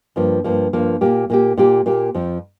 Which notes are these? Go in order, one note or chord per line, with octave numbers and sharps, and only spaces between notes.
G2 F3 A#3
G2 F3 A#3
G2 F3 A#3
A#2 A#3 G4
A#2 A#3 G4
A#2 A#3 G4
A#2 A#3 G4
F2 F3 C4